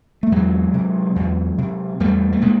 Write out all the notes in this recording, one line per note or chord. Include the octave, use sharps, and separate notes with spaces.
A3
E2 F#3 G#3
C3
E2
C3
E2 G3 A3
A3
C3 G#3 A#3